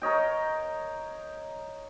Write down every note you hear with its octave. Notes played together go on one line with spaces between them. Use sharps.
A#4 C#5 D#5 G5